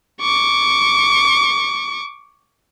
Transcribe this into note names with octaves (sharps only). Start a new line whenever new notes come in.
C#6 D6